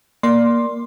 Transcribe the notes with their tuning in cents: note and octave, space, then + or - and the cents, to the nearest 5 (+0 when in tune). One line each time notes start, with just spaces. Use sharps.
A#3 +10 D5 +0 C6 +5